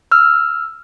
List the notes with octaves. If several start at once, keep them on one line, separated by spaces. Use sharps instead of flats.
E6 F6